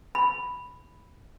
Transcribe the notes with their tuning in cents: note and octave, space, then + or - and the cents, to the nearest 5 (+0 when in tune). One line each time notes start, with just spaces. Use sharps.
B5 -5